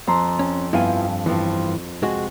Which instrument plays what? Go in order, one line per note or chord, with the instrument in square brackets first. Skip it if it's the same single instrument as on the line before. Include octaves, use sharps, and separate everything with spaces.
[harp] F2 A#5 C6
[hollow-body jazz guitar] C#4
[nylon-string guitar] G2 F5 G#5 [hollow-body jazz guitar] F3 B3 E4
[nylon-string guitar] G2 F3 B3 [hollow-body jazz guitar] E3
[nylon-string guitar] C3 [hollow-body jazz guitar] G#3 F#4